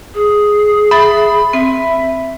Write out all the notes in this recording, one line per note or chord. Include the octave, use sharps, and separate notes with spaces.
G#4
E5 B5 A6
C4 E5